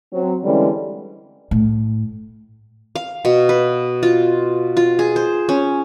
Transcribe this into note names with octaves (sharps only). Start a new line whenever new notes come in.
F#3 C4
D3 E3 G3 G#3 C4 C#4
A2
F5
B2
B4
F4
F4
G#4
C5
C#4